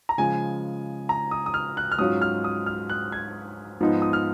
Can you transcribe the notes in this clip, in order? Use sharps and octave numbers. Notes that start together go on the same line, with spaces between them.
A#5
C#3 F3 G#3 G#5
A#5
D#6
D#6
F6
F#6
F6
G#2 F#3 C#4 F4 D#6
F6
D#6
F6
F#6
G#6
G#2 F3 B3 D#4
D#6
F6